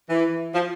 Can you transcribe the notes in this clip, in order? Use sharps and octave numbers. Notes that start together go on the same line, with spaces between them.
E3
F3